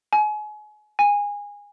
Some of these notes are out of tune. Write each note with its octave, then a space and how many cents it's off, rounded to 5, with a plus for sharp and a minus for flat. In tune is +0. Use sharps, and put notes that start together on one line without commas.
G#5 +30
G#5 -20